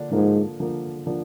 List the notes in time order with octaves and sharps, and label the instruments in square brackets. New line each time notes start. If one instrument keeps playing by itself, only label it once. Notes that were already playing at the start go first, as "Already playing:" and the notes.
Already playing: [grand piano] D3 F3 A#3 D4
[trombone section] G#2 [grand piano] D3 F3 A#3 D4
[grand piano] D3 F3 A#3 D4
D3 F3 A#3 D4